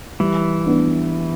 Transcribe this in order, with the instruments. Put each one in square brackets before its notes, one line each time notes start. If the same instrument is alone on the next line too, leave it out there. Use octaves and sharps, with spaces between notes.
[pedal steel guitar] E3 [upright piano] G3
[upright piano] B3 D4